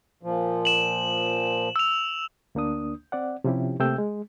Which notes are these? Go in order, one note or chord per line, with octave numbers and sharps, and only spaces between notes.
A#2 F3
E7 F#7
E6 F7
D2 A#3 D4 D#6
C4 D5 F#5
C3 F3 C#4 E4 G4
C3 A3 A#3 G5 E6 G6
G#3